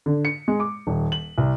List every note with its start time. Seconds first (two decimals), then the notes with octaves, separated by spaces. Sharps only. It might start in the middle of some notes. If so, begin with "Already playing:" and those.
0.06 D3
0.25 C#7
0.48 G#3
0.60 D6
0.87 D#1
1.12 F#7
1.38 C2